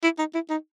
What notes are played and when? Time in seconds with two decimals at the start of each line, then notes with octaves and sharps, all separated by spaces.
0.03 E4
0.19 D#4
0.34 E4
0.50 D#4